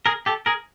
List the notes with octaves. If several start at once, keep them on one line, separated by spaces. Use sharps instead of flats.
G#4 A#4
G4 A4
G#4 A#4